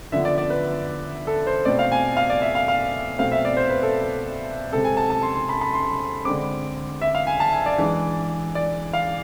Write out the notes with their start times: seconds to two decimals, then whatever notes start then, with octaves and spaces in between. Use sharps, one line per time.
0.12 D3 F3 B3 E5
0.25 D5
0.38 D5
0.50 B4
1.27 A4
1.47 C5
1.65 B2 A3 C4 D5
1.79 F5
1.92 G#5
2.17 F5
2.30 D5
2.42 E5
2.55 F5
2.68 F5
3.19 B2 A3 C4 F5
3.32 E5
3.45 D5
3.57 C5
3.70 B4
3.83 A4
4.72 C3 G#3 C4 A4
4.84 G#5
4.97 A5
5.10 A5
5.23 C6
5.35 C6
5.49 B5
5.61 B5
5.74 C6
6.25 D3 G#3 C4 D6
7.01 E5
7.15 F5
7.27 G#5
7.40 A5
7.53 G#5
7.66 D5
7.78 E3 G#3 D4
8.55 D5
8.93 F5